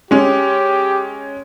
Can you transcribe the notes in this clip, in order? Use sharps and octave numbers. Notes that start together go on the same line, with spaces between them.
G#3 C#4 G4